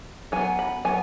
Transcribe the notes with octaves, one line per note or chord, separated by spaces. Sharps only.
F#3 B3 G#5
B5
F#3 B3 G#5